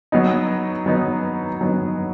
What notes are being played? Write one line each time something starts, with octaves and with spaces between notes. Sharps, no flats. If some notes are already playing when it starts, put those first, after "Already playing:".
F#3 B3 D#4
F#3 B3 D#4
F#3 B3 D#4